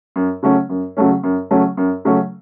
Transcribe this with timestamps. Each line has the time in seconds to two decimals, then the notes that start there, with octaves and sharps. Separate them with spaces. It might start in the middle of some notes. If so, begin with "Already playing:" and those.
0.16 F#2
0.43 C#3 F#3 A3 C#4
0.69 F#2
0.97 C#3 F#3 A3 C#4
1.23 F#2
1.51 C#3 F#3 A3 C#4
1.77 F#2
2.05 C#3 F#3 A3 C#4